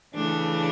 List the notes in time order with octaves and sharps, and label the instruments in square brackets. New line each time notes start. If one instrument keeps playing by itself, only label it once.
[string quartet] C#3 E3 A3 D4